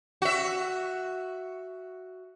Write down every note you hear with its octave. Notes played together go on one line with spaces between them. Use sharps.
F#4 E5